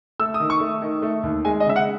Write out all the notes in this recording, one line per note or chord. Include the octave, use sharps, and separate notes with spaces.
A3 E6
D#6
D#3
C#6
A3
D#3
A3
D#2
G#3 G#5
D#5
C#3 E5
F#5